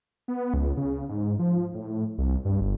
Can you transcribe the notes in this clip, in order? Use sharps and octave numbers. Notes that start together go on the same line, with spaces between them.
B3
C#2
C#3
G#2
F3
A2
C2
G2
G1